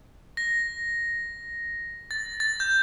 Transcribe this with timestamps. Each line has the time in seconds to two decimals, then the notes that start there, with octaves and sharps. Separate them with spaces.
0.37 A#6
2.11 A6
2.40 A6
2.60 G6